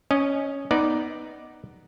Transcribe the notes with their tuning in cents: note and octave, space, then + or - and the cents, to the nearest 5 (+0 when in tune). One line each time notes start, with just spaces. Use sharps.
C#4 +0 D#5 -15
B3 +0 D#4 +0 D5 +0